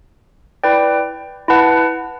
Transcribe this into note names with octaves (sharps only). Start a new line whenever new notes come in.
E4 B4 D5 G5
E4 B4 F#5 A5